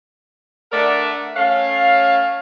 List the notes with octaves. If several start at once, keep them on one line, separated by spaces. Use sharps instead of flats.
A3 D4 A#4 D5 E5 F#5
A3 C#4 C#5 F5